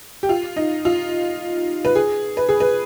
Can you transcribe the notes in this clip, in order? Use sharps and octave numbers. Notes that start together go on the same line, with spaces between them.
G4
F4
D#4
F4
B4
G#4
B4
G#4
B4